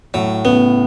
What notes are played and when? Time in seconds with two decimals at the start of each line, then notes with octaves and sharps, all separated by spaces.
0.14 A2 F#3
0.45 A2 C#3 B3